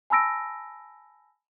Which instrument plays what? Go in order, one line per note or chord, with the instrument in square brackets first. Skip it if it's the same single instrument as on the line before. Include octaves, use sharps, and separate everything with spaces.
[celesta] G#5 A5 B5 E6 A#6 D7